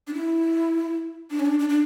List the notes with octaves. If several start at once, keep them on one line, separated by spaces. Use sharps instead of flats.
D4
E4
D4
C#4
D4
D4
D4